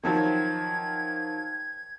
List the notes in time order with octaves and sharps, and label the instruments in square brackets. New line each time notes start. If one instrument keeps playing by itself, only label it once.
[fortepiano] D#3 F3 F#3 [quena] G#6